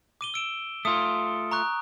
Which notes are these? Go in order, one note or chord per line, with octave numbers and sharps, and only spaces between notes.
D6 D#7 G7
E6 D7 E7
A3 F4 D#6
A#5 C#6 F#6